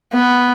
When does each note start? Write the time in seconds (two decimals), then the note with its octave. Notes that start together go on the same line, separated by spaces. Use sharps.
0.13 B3